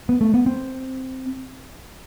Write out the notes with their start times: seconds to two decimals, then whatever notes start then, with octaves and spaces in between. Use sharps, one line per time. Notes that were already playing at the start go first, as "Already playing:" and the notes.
0.09 B3
0.21 A3
0.34 B3
0.46 C4